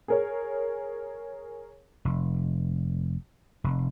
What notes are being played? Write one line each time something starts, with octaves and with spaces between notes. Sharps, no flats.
G#4 A#4 C#5
F1
F1